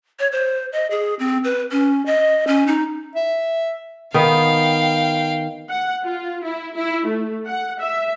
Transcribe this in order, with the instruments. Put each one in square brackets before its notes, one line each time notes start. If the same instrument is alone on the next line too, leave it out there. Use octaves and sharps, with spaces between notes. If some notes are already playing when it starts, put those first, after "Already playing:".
[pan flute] C#5
C5
D#5
G#4
C4
B4
C#4
D#5
C#4
D#4
[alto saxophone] E5
[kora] D#3 B3 [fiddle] F5 G5
[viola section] F#5
F4
E4
E4
A3
F#5
E5